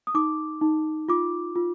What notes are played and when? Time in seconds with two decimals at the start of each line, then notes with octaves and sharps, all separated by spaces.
0.07 D#6
0.14 D#4 D6
0.61 D#4
1.09 F4 D6
1.56 F4